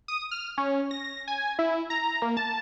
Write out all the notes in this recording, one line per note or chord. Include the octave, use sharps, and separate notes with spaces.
D#6
F6
C#4
A#6
G#5
E4
A#5
A#3
A5